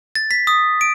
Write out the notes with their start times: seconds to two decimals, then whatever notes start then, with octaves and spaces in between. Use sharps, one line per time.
0.15 A6
0.31 B6
0.47 D#6
0.81 D7